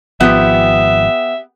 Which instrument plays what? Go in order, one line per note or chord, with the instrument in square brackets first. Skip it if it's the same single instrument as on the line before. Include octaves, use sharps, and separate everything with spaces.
[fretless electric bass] G#1 F3 [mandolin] B3 G4 [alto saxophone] E5